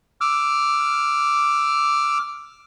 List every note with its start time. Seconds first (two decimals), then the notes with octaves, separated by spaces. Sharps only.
0.21 D6 E6 F6